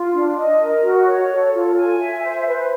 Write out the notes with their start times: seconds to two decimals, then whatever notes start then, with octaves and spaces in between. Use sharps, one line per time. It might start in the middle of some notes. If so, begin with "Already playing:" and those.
Already playing: F4
0.13 D4
0.36 D#5
0.60 A#4
0.83 F#4
1.06 C#5
1.30 A4
1.53 F4
1.77 G#5
2.00 E5
2.23 C5
2.47 B4